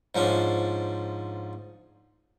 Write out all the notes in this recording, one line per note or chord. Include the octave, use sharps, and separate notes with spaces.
G#2 F3 C#4 D4